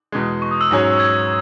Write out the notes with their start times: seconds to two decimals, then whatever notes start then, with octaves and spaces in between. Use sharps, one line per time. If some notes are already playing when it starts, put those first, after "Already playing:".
0.12 E2 B2 G#3
0.42 C#6
0.51 D#6
0.61 E6
0.71 G#2 F#3 C#4 G#4 C#5
1.00 G#6